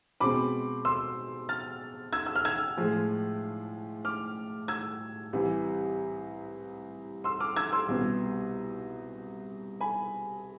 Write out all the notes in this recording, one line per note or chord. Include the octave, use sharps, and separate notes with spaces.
B2 G#3 C4 B5 D6
C6 E6
F6 A6
E6 G#6
E6
F6
E6 G#6
A2 F3 G#3
D6 F6
E6 G#6
C2 C3 E3
C6 E6
D6 F6
E6 G#6
C6 E6
C2 B2 B3
G#5 B5